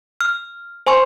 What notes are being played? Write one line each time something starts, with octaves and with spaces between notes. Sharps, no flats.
F6
C5 G#5 C6 C#6